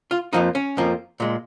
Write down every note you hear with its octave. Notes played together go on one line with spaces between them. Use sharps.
F4
F2 F3 A#3 D#4
C#4
F2 F3 A#3
A#2 G#3